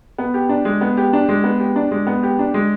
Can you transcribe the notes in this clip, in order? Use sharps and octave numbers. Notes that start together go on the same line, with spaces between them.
B3
G4
D4
G#3
B3
G4
D4
G#3
B3
G4
D4
G#3
B3
G4
D4
G#3